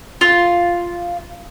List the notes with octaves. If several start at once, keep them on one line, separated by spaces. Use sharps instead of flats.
F4